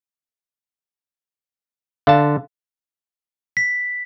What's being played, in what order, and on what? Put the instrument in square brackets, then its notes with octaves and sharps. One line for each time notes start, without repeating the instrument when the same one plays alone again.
[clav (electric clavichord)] D3 A5 [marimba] F5
[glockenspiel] B6